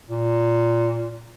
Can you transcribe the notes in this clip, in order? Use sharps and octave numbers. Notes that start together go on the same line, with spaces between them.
A#2